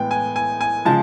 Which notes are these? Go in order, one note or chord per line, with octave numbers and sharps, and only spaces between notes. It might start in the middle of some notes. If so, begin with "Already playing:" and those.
Already playing: A2 E3 G#3 B3 G5
G#5
G#5
G#5
C#3 F3 G#3 A5